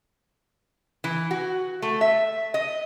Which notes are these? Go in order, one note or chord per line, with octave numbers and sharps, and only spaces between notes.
E3
F#4
A3
E5
D#5